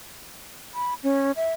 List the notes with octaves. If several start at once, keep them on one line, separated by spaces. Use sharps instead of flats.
B5
C#4
E5